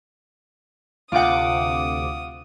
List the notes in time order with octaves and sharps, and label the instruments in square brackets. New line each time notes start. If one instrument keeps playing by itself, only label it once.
[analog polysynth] D2 C3 D6 [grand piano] F4 F#5 [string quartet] D#6